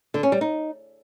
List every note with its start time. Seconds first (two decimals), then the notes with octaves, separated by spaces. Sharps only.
0.14 D3
0.23 C#4
0.32 G3
0.41 D#4